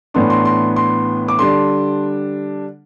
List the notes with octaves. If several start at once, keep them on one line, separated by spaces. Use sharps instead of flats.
A2 E3 B3 D4 C6
C6
C6
C6
D6
D3 G3 D4 C6